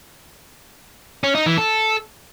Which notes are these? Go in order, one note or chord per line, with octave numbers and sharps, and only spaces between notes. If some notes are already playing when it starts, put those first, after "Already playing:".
C#4
D#4
E3
A4